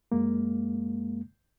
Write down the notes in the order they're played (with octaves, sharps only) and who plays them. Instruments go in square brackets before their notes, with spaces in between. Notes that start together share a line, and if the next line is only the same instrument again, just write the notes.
[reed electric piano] F#2 G#3 A#3